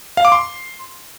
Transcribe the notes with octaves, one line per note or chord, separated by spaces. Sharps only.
F5
D6
C6